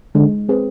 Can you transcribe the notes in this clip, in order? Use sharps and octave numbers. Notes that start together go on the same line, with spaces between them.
D3 G#3
C4 G#4 B4